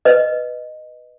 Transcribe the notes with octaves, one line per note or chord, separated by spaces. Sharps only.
B4 D#5